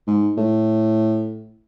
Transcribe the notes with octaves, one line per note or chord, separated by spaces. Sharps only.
G#2
A2